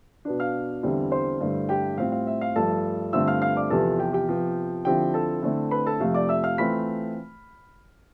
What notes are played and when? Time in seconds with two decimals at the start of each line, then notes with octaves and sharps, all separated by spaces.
0.25 B2 B3 D4
0.40 F5 F6
0.83 E2 D3 G3 C4 E4
1.12 C5 C6
1.40 G2 D3 A3 E4
1.69 G4 G5
1.97 A2 G3 C4 F4 F5
2.12 F5
2.27 E5
2.41 F5
2.56 G2 F3 A3 A4 A5
3.13 G2 D3 A3 C4 F4 E5 E6
3.27 F5 F6
3.42 F5 F6
3.56 D5 D6
3.70 E2 C3 F3 B3 A4 A5
3.99 G4 G5
4.13 G4 G5
4.28 C3 F3 B3
4.85 D3 F3 C4 E4 G4 G5
5.14 A4 A5
5.43 D3 A3 C4 E4
5.71 B4 B5
5.86 A4 A5
6.00 F2 C3 F3 A3 F5
6.14 D5 D6
6.29 E5 E6
6.44 F5 F6
6.58 E3 A3 C4 F4 B5 B6